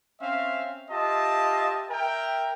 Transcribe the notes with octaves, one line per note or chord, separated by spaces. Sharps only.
C4 C#4 E5 F5
F4 G4 D#5 E5 A5
A#4 E5 G5